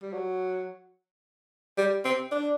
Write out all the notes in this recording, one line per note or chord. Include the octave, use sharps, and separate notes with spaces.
G3
F#3
G3
C4
D4